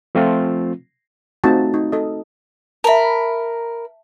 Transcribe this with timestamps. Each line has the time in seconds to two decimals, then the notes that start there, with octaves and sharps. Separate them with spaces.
0.15 F3 A3 C4 F4
1.44 A3 C4 D#4 F4 F#4 A5
1.74 D#4
1.92 A4 D#5
2.84 A#4 E5 A5 B5